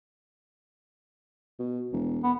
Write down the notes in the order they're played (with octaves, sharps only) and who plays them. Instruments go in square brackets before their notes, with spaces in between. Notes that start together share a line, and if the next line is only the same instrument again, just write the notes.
[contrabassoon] B2
E1
[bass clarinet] B3